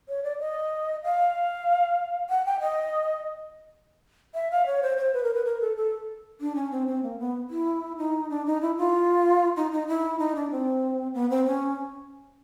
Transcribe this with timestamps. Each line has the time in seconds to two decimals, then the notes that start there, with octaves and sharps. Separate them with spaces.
0.09 C#5
0.24 D5
0.39 D#5
1.04 F5
2.30 F#5
2.46 G5
2.61 D#5
4.35 E5
4.51 F5
4.66 C#5
4.83 C5
4.97 C5
5.14 B4
5.24 A#4
5.34 B4
5.45 A#4
5.61 A4
5.77 A4
6.41 D4
6.56 C#4
6.72 C4
6.87 C4
7.03 A#3
7.19 B3
7.50 E4
7.98 D#4
8.30 D4
8.46 D#4
8.62 E4
8.77 F4
9.57 D#4
9.72 D#4
9.88 E4
10.19 D#4
10.35 D4
10.51 C4
11.14 B3
11.30 C4
11.46 C#4